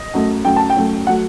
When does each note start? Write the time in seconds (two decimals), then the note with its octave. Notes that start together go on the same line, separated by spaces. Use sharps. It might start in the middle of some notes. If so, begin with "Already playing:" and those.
Already playing: D#5
0.14 F#2 F#3 A3
0.45 F#2 F#3 A3 G5
0.56 A5
0.70 G5
0.76 F#2 F#3 A3
1.07 F#3 A3 F#5